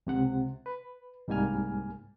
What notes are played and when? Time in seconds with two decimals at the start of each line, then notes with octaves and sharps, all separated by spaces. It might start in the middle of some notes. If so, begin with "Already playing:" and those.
0.07 C#2 C3 F#5
0.66 B4
1.28 C2 G#2 G3 A#3 G#5 F6